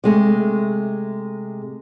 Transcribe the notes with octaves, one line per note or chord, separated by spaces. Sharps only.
C3 G#3 A3